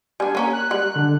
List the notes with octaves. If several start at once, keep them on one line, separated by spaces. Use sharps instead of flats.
G3 D4 G#5
A#3 C#4 A#4
F#6
G3 G#3
D3